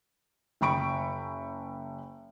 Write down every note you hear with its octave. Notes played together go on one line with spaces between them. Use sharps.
F#1 G5 B5 C#6 D7